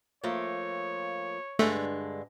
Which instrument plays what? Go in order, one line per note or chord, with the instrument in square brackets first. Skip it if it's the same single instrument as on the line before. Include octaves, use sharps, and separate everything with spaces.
[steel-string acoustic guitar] F3 A3 A#3 [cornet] C#5
[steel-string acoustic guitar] G2 D3 G#3 [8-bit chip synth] A3